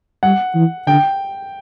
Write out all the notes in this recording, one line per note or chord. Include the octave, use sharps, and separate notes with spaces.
G3 F#5
E3
D3 G5